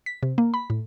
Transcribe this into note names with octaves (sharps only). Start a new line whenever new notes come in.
B6
C3
A#3
B5
A2